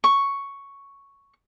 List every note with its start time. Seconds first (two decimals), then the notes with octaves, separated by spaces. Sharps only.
0.04 C#6